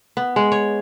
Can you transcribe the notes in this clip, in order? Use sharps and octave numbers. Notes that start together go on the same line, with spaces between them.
B3
G#3
C#5